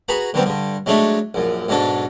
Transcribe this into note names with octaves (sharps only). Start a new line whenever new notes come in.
F#4 G#4 B4 A#5 B5
D3 F#3 G3 B3 C4
G2 D3
F#3 G#3 A3 D4 C#5 E5
A#1 F#2
B1 G#2 F#3 D4 A4